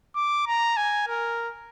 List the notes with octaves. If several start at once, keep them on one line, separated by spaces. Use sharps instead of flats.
D6
A#5
G#5
A#4